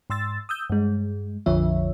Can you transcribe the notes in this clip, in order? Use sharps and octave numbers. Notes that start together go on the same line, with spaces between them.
G#2 C6 E6 A6
D#6 E6 G6
G2 G#3
A#1 F2 D3 F3 C#5 E5